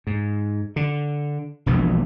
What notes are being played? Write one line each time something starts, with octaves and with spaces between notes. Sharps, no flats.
G#2
D3
E1 A#1 E3